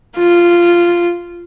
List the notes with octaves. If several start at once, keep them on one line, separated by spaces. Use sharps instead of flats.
F4